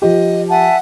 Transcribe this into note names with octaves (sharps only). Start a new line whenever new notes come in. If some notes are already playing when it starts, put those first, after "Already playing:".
F3 G4 D#5
E5 F#5 G#5 A5